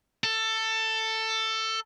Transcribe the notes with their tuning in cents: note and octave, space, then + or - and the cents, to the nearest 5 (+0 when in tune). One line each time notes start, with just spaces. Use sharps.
A4 +15